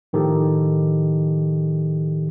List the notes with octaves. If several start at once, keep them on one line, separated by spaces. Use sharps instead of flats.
A2 D#3 F3 G4 A4